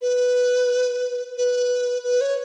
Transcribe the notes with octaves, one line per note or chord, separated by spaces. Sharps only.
B4
B4
B4
C#5